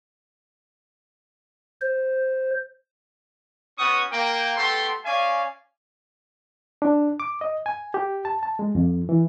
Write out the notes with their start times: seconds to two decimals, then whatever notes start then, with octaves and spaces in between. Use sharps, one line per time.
1.81 C5
3.79 B3 C#4 F#4 F#5 C#6 D#6
4.11 A#3 G5
4.56 A3 B3 G4 A4 C6
5.05 C#4 D5 F5 G#5
6.82 D4
7.20 D6
7.41 D#5
7.66 G#5
7.94 G4
8.25 A5
8.43 A5
8.59 G#3
8.75 F2
9.09 E3